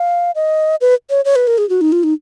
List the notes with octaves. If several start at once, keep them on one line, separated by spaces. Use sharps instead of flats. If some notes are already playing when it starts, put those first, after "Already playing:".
Already playing: F5
D#5
B4
C#5
C#5
B4
A#4
G#4
F#4
D#4
F4
D#4